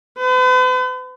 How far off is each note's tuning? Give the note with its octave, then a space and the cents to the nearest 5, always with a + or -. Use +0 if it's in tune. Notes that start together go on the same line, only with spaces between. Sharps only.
B4 +45